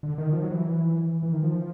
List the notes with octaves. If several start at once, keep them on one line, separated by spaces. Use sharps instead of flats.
D3
D#3
F3
F#3
E3
E3
D#3
F3